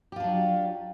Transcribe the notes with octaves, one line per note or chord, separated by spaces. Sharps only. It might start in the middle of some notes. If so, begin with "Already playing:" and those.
F#3 D4 F4 G4